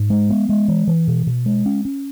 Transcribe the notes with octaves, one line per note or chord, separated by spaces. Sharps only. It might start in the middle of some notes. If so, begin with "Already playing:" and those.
Already playing: G#2
G#3
B3
G#3
E3
E3
B2
B2
G#3
C#4
C#4